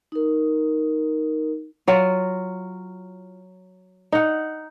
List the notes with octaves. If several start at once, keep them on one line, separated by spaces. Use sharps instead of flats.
D#4 A#4
F#3 F4
D#4 F#5